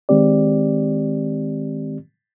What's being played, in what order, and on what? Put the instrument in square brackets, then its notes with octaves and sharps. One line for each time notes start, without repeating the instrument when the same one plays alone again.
[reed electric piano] D#3 G#3 C4 G4 D5